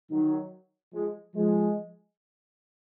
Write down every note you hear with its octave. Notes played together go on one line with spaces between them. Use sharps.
D#3 F#3
F3 G#3
F3 G#3